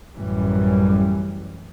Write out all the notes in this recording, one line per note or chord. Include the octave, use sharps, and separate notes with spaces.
A1 F#2 E3 G3